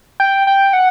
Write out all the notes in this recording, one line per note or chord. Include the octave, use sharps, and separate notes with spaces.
G5
G5
F#5